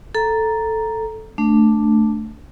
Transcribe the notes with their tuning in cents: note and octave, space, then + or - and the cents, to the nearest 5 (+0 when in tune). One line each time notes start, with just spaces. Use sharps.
A4 +0 A#5 +0
A3 +0 D4 +0